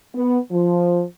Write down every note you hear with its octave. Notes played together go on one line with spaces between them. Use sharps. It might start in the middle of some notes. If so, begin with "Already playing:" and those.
B3
F3